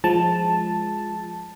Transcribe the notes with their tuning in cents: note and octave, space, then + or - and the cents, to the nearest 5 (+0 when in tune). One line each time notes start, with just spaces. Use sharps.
F3 +0 G#3 +0 A5 +0